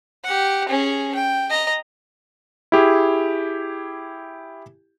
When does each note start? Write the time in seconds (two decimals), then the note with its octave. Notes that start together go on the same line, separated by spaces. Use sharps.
0.24 G4 F#5
0.69 C#4 G#4
1.15 G5
1.50 D#5 A#5
2.72 E4 G4 G#4